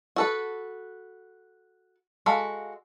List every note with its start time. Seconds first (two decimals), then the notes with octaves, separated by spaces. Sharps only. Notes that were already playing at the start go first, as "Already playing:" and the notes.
0.16 F#4 A4 B4
2.26 G#3 F#4 A4 F5 B5